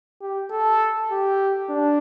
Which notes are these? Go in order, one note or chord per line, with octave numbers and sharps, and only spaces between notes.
G4
A4
G4
D4